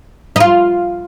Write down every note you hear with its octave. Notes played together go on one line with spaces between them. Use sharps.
D#4
F4